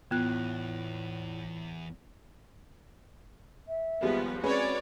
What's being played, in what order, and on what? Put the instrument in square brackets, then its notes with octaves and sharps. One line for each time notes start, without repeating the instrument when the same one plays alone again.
[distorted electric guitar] E2 [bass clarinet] A2 [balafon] B3 [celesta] F4 F#6
[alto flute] E5
[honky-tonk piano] D#2 G3 G#3 [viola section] F3 B3 B4
[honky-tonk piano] G#3 C#4 B4 [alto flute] C4 [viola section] F#4 C#5 D5